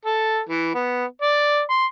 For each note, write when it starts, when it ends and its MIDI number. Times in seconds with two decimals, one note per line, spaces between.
0.05 0.39 69
0.49 0.70 52
0.75 1.05 59
1.22 1.61 74
1.70 1.85 84